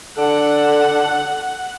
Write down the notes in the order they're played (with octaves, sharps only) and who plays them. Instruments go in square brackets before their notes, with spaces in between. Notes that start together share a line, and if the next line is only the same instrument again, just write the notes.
[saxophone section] D3 D4 A4 [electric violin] F#5